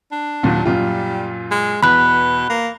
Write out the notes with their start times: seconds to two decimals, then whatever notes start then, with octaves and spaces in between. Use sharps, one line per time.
0.12 D4
0.43 D#2 A#2 F#3
0.65 F#2 A#2 G3 F4
1.51 G#3
1.83 E2 B2 B5 F#6
2.50 A#3